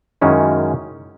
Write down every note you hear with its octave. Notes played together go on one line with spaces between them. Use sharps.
F#2 D#3 G#3 C#4 E4